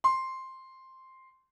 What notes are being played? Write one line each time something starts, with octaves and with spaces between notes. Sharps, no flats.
C6